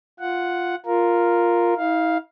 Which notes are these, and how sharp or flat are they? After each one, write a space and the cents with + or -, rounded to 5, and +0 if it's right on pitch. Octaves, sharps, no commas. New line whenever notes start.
F4 +0 F#5 +0
F4 +0 A#4 +0
E4 -45 F5 +0